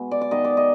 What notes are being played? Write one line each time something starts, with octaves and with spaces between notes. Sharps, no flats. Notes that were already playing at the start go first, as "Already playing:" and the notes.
Already playing: B2 G#3 B3
D5
D5
D#3 B3 D#5
D5
D#5